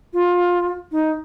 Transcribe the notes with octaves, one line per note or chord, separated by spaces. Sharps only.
F4
D#4